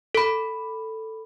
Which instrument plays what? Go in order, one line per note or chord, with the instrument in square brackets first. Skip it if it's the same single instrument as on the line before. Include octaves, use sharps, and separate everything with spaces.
[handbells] A4 B5